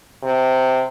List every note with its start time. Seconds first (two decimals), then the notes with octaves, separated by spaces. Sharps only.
0.23 C3